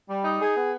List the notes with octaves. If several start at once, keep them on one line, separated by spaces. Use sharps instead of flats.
G3
D#4
G#4
B3